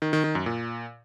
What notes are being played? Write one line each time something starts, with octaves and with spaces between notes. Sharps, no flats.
D#3
D#3
D#3
F#2
A#2